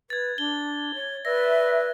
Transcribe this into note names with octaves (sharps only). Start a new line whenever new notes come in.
B4 G#6 A6
D4 G7
C#5
B4 D5 E5 A#6